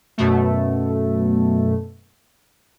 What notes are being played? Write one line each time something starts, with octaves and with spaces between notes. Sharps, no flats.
F#2 B2 A3